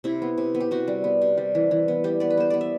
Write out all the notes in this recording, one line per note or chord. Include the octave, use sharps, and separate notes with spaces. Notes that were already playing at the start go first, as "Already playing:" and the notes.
C3 E4
B3
C3
B3
G4
C3 F#4
G3
B3
C3
G3
E3
E3
B3
G3 G4
B3 D5
B4
B3 C5
B3 D5
E5